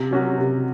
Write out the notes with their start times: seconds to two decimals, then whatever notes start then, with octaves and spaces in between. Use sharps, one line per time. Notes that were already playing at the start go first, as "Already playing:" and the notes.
Already playing: C3
0.11 F#3 C#4 F#4
0.38 C3